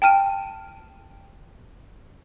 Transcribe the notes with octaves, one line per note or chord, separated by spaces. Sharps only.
G5 A5 F6 D#7